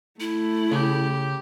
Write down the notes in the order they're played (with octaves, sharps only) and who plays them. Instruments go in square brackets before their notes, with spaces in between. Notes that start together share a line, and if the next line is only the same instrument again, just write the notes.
[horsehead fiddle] A3 [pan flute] E4
[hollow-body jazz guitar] C#3 [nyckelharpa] G4